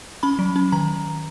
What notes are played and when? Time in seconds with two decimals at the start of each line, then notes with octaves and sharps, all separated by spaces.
0.23 C#4 B5
0.39 F#3
0.56 C#4
0.72 D#3 A#5